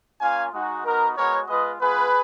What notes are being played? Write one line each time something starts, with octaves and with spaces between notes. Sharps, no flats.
A#3 C#4 F4 F5 G#5
G#3 D#4 F#4
B3 D#4 F#4 A#4
G#3 B3 F#4 A#4 C#5
G#3 B3 F4 B4 D#5
G#3 B3 F4 G#4 B4